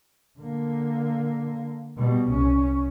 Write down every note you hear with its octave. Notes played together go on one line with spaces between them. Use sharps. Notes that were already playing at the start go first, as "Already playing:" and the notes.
D3 A#3
B2 G3
C2 C#4